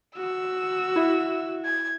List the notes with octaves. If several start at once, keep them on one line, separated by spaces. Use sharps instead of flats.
F#4 E6
E4 E5
G#6